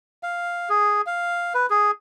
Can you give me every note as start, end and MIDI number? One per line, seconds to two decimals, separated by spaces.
0.23 0.69 77
0.70 1.01 68
1.06 1.53 77
1.54 1.66 71
1.70 1.91 68